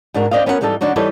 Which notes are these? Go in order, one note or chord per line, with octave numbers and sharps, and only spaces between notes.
G#2 D4 F#4 A#4
C4 D4 D5 D#5 F5
B3 C#4 F#4 A#4 C#5 F#5
G#2 E3 G3 D#4 A4
D3 F#3 D4 D#4 F#4
E3 G3 D#4 A4 B4 C#5